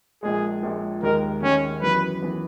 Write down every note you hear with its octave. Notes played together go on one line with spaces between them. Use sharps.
A#1 A#2 G#3 G#4
A#1 A#2 G#3
D#2 D#3 G#3 A#4
D#2 D#3 G#3 C#4
F#2 E3 B3 B4
E3 B3